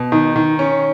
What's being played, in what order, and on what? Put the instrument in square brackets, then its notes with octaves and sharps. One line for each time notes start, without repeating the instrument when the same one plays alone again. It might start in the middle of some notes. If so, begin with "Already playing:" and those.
Already playing: [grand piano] B2
[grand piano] D#3 [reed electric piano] D#4
[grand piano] D#3
C#4